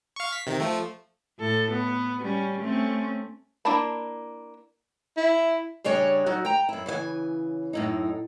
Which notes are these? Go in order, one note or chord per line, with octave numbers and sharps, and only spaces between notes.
F5 C#6
B6
C3 D#3
F3 A3
A2 A4
B3
G3 C#4
A3 C4 C#4
A#3 D4 E4 A5 B5
E4
C#3 G3 D4 C#5 D#5 G#5
F#3 D#4 F#4
G5 A#5
F#2 E4
C#3 E3 E5 G#5
F#2 A2 D#4